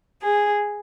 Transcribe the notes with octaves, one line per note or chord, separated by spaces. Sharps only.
G#4